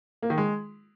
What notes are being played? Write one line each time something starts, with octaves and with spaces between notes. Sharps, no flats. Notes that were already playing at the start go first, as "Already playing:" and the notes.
A#3
D#3
G#3